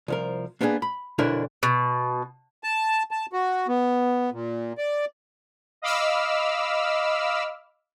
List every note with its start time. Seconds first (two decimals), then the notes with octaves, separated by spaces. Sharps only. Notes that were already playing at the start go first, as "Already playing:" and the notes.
0.08 C2 F3 A#4
0.61 A#3 B3 D4 F4 G#4
0.82 B5
1.18 B1 F2 D3 D4 E4 A#4
1.63 B2
2.64 A5
3.11 A5
3.33 F#4
3.68 B3
4.32 A#2
4.78 D5
5.82 D#5 F5 B5 D6 E6 F6